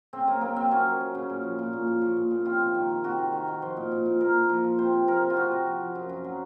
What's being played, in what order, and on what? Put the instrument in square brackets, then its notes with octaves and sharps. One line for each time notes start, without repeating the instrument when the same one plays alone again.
[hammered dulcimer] C#3 C4
F#2 A#3
F#2 A#3
F#2 C4
F#3 C#4
F#2
F#2
C#3
A#2
F3
A#2
A#2
A#2
F3
A#2
A#2
C3 F4
C3
D#3
D#3
C3 F#4
D#3
D#3
D#3
F3 C5
A#2
A#2
A#2
F3 A#4
A#2
F3
F3
C3 C5
C3
F3 A#4
C3
F4
C3 F#4
C3
F3
F3
F#2
F#2
F#3